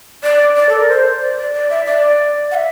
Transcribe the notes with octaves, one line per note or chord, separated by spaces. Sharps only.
D5
D5
A4
A#4
C5
D5
D5
D5
E5
D5
F#5
E5